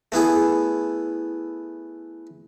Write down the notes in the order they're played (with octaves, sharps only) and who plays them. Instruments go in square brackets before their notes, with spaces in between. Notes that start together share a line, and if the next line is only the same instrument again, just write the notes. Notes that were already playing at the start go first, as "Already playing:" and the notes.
[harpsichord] A3 B3 E4 G#4